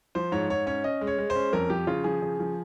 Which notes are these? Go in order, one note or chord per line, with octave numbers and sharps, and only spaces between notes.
F3 C5
G#2 C#5
G#2 C#5
C#4 C#5
C#4 D#5
G#3
C#5
G#3
C5
C#4
F2 A#4
F3 G4
C#3 F4
F3 G#4
C#3
F3